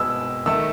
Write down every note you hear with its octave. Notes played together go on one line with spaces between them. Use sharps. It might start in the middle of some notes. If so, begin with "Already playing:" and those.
Already playing: B2 G#3 B3 E6
D#3 A3 E6